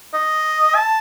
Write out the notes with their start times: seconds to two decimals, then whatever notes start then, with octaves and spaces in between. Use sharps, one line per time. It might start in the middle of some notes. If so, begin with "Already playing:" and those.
0.14 D#5
0.75 A5